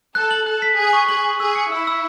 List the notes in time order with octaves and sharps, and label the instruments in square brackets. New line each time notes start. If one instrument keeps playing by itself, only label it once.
[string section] A4 [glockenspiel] F#6
[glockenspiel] F#7
[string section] A4 [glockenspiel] F#6
[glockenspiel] B6
[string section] G#4 [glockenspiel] F#6
[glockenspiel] C#6
[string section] G#4 [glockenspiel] F#7
[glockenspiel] F#7
[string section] G#4 [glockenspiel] E6
[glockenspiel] C#7
[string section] E4 [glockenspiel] E6
[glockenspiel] E6